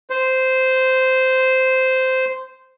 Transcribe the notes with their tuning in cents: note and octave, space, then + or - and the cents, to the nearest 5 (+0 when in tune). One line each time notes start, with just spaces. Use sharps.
C5 -10